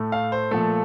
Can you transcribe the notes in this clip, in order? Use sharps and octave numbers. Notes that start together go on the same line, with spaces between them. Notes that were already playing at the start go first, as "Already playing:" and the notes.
Already playing: A2 A3
F5
C5
A#2 F3 A3 A4